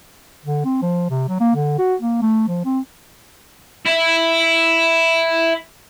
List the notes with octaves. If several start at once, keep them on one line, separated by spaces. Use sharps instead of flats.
D3
C4
F3
C3
F#3
A#3
D3
F#4
A#3
A3
F3
C4
E4 E5